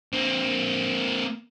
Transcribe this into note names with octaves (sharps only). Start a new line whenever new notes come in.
A#3 C4